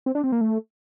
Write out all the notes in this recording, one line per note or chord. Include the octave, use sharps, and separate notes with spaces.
C4
D4
C4
A#3
A3